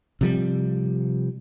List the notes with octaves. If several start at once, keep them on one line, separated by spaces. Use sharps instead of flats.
C3 F3 G3